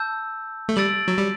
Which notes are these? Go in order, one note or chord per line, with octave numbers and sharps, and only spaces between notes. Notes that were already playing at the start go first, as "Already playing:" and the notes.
Already playing: A5 E6 G6
A3
G3 E6 A6 D7 F#7
F#3
G3